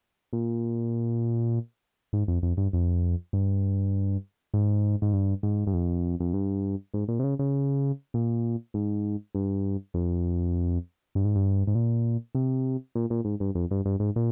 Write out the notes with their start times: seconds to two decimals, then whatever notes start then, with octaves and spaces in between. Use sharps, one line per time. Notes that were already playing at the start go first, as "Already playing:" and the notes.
0.33 A#2
2.13 G#2
2.28 F2
2.43 F2
2.57 G2
2.73 F2
3.33 G2
4.54 G#2
5.02 G#2
5.13 G2
5.43 G#2
5.67 G2
5.73 F2
6.20 F2
6.34 G2
6.94 G#2
7.08 A#2
7.19 C3
7.24 C#3
7.39 C#3
8.14 A#2
8.74 G#2
9.35 G2
9.94 F2
11.15 G2
11.25 G#2
11.36 G2
11.67 G#2
11.75 A#2
12.35 C3
12.95 A#2
13.10 A#2
13.25 G#2
13.40 G2
13.55 F2
13.71 G2
13.86 G2
14.00 G#2
14.16 A#2